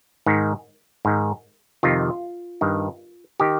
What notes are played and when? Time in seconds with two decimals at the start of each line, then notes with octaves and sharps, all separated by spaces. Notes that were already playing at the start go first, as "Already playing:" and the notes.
0.26 G#2 D#3
1.05 G#2 D#3
1.83 F2 C3 D#3 F4
2.61 G2 D#3
3.40 D#3 G4